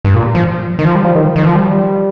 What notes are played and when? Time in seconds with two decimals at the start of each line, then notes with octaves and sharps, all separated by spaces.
0.05 G2
0.14 A#2
0.35 F3
0.79 D#3
0.85 F3
0.95 G3
1.04 F3
1.15 D#3
1.36 D#3
1.45 F3
1.55 G3